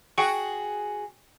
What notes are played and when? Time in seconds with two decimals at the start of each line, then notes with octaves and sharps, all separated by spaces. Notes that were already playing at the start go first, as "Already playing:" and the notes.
0.18 F#4 G#4 F#5 G5 C#6